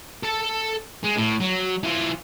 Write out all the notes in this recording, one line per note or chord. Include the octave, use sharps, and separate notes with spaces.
A4 A5
G#3
A2
F#3
E3 F4